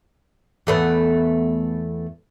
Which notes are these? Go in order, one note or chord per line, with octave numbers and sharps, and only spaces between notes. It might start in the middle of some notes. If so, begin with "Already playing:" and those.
E2 A3 B3